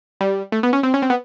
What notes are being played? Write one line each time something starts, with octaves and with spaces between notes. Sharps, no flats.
G3
A3
B3
C#4
C4
C#4
C4
B3